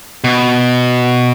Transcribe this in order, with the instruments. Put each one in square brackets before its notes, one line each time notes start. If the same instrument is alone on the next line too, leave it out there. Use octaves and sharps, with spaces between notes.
[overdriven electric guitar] B2